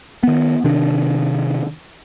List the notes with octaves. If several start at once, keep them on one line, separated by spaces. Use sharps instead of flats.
D#3 B3
C3 D#3 D4